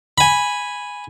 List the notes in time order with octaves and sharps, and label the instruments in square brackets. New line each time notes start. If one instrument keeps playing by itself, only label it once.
[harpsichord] G#5 B5